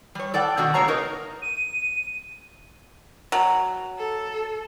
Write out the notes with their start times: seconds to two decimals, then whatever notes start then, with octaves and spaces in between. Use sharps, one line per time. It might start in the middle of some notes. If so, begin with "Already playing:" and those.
0.15 G3 C#5
0.34 A4 D5 F#5 G5
0.57 B2 D3 D#3 A3 F#4
0.74 C#3 G#3 A#3 C#5 F5 A#5
0.88 D#4 A#4 B4 D#5
1.42 D#7
3.32 F#3
3.97 A4